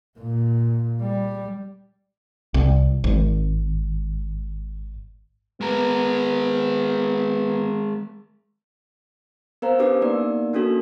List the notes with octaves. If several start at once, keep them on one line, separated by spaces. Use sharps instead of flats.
A#2
G3
C2
G#1
G#3 B3 A#4
B3 A#4 C5 F5 A#5
C#4 D4 G4 B4 D6 E6
A#3 B3 D#4 A#4 D5
A#3 C#4 D4 F#4 A4 A#4